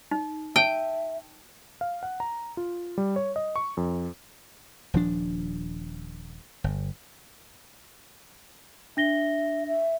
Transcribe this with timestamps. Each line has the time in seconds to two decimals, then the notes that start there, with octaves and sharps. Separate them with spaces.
0.11 D#4
0.56 E5 G5 A5
1.81 F5
2.03 F#5
2.20 A#5
2.57 F4
2.98 G3
3.16 C#5
3.36 D#5
3.56 C#6
3.77 F2
4.94 D#1 F3 D4
6.64 G1
8.97 D4 E5 A#6 G7
9.67 E5